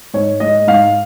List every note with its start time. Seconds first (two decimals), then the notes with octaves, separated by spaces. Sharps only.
0.14 G#2 C#5
0.40 G#3 D#5
0.67 G#2 F5